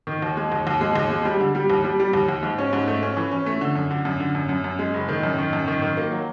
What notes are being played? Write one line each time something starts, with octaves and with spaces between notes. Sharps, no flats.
D#3
D#2
G#3
D#2
D#2
G#3
D#2
G#3
G3
D3
G3
D#2
G3
G3
D#2
D#2
G#2
C#4
G#2
A3
C#4
E3
C#4
A3
D3
F#2
D3
F#2
D3
F#2
F#2
F#2
G#3
F#1
D#3
F#2
D#3
F#2
D#3
D#3
A#3
F#3